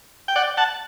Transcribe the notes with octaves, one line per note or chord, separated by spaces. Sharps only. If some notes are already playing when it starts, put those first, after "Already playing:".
G5
D5 F#5
F#5 A5